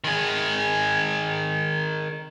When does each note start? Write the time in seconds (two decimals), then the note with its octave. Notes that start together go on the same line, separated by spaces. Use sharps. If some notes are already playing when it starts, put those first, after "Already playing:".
0.04 D#3 G#4